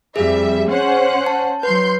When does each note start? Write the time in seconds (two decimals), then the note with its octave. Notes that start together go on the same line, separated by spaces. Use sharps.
0.16 F2 G3 G#4 E5
0.69 C#4 C5 F#5
1.26 A5
1.63 F#3 B4 C6 G6